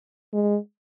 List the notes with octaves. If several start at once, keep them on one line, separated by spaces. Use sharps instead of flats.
G#3